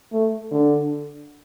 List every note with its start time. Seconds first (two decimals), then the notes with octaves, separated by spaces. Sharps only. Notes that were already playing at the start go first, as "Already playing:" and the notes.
0.13 A3
0.51 D3